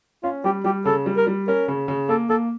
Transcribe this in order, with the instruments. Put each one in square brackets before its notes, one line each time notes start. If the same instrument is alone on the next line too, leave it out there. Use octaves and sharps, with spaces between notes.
[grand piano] C#4 [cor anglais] F4
[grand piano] G3 [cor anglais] G4
[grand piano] G3 [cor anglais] G4
[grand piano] C#3 [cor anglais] A4
[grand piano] G3
[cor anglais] A#4
[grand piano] G3
[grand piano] C#4 [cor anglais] A#4
[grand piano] C#3
C#3
[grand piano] A#3 [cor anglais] A4
[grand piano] A#3 [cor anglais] A4